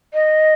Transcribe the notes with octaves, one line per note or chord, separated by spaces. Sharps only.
D#5